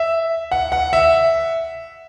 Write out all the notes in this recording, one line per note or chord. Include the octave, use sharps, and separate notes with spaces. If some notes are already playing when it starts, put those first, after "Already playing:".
Already playing: E5
F#5
F#5
E5